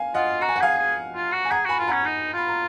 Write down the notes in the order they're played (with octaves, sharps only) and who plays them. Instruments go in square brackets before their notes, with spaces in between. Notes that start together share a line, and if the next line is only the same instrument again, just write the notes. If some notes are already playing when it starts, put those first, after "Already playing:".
Already playing: [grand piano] F5 G#5
[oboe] F4 [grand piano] D#5 F#5
[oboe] F#4 [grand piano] A#5
[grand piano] G#5
F#5
[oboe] G#4 [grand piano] F5 G#5
[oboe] G#4
F4
F#4
[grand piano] G#5
[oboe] G#4 [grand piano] F#5 A#5
[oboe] F#4 [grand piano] G#5 B5
[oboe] F4
[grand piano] F#5 A#5
[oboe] C#4
D#4
[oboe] F4 [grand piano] B5
[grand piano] A#5